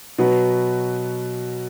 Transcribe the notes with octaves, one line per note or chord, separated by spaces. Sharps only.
B2 F#3 B3